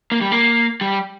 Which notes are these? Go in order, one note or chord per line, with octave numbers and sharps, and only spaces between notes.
A#3
G3
A#3
G3